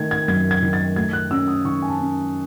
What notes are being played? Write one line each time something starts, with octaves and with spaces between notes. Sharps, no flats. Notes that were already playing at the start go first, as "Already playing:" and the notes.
Already playing: D#3 A3 G#6
G#6
F#2 G#6
G#6
D#3
A6
A3 G#6
F#6
C#4 E6
D#6
D#3 C#6
G#5
A5
C#4